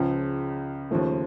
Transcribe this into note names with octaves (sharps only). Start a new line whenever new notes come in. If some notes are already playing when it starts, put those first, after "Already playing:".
Already playing: C#2 C#3 F3
D#2 C#3 F3 A3